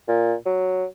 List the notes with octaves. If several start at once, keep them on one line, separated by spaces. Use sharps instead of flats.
A#2
F#3